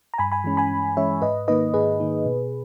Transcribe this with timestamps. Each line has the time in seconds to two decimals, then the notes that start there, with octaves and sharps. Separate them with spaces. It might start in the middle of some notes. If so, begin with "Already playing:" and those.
0.14 A#5
0.18 G2 G#5 B5
0.32 G#5 B5
0.44 E3 G#3 C#4
0.57 G#5 B5
0.71 G2
0.97 E3 G#3 C#4 C#5 E5
1.22 G#2 B4 D#5
1.48 D#3 A#3 D#4 B4 D#5
1.74 G#2 G#4 B4
2.00 D#3 A#3 D#4
2.26 B2